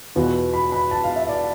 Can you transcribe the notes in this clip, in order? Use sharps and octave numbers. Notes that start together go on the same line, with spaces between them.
E2 B2 B3 F4
B5
B5
A5
F5
E5
D5